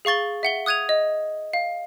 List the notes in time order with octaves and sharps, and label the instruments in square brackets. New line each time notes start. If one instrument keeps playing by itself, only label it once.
[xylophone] G#4 F5 C#6 A6 G7
E5 F#5 G7
D#6 F#6 G#6 D#7 F7
D#5
F5